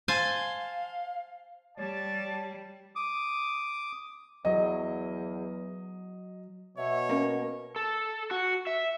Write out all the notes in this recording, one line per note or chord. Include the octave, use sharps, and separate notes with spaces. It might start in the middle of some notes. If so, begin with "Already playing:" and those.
C5 F5 G#5 A5
G3 C#5 D5 A5
D6 D#6
E2 F#3 D#5
B2 C#5 E5
A#3 C#4 A#4
A4
F#4
E5